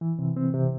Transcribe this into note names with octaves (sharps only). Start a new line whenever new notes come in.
E3
C3
C4
C3